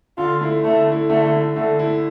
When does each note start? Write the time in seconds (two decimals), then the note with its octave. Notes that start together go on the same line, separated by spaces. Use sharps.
0.18 D3 F4
0.41 A3 E4
0.64 D3 A3
0.87 A3 E4
1.10 D3 A3
1.33 A3 E4
1.56 D3 A3
1.79 A3 E4